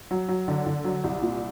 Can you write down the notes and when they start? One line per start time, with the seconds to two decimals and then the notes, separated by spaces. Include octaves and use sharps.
0.11 F#3
0.29 F#3
0.48 D3
0.66 D3
0.84 F#3
1.04 C2
1.22 A#2